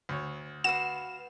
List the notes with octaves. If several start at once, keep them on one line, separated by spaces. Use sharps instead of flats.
D2 C#5
F#4 B4 F5 E7